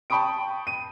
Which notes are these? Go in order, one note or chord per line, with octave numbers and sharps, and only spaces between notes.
G5 A5 B5 C#6 D#6 D7
D#7